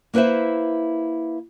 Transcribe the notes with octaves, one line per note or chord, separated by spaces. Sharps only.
A#3 E4 B4 C5 E5